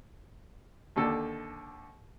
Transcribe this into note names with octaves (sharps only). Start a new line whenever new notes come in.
D#2 D3 A4